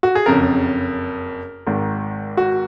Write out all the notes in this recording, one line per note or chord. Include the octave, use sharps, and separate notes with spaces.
F#4
G#4
F#1 F2 C#3 A#4
G#1 G#2 D#3
F#4